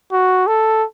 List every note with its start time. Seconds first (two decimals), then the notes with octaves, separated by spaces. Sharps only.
0.12 F#4
0.47 A4